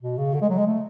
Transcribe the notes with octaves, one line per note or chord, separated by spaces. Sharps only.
B2
C#3
D3
G#3
F#3
G#3
A3